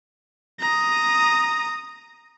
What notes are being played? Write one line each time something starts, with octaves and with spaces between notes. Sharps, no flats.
A#5 D#6